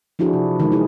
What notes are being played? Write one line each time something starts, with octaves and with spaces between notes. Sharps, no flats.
F3 D4 E4 F#4 G#4
C3
D#3 E3 G3 G#3
E4 G#4